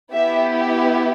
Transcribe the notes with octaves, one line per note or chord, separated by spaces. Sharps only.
B3 E4 G4 E5